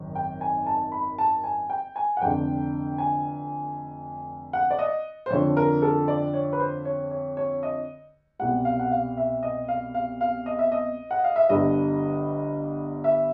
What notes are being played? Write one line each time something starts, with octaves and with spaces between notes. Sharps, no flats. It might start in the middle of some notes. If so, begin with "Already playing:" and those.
Already playing: G#1 F#2 D#3
G5
G#5
A5
B5
A5
G#5
G5
G#5
F#5
F1 F2 D3 G5
G#5
F#5
D5
D#5
C5
F2 D3 F3 C#5
A#4
A4
D5
C#5
B4
C5
C#5
C#5
C#5
D#5
C2 B2 G3 F#5
F5
F#5
F5
E5
D#5
F5
F5
F5
D#5
E5
D#5
F#5
F5
E5
G1 G2 D3 G3 D#5
E5